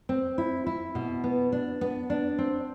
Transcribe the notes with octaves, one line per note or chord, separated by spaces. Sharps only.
C4
E4
E4
B2
B3
D4
B3
D4
C4